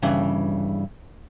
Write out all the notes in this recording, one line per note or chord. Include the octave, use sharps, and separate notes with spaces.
G2 C#3 E3